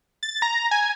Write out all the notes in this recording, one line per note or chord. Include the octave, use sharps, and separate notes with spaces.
A6
A#5
G#5